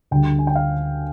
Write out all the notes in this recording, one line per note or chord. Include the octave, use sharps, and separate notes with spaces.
D2 D3 G3 G5
G#5
G5
F5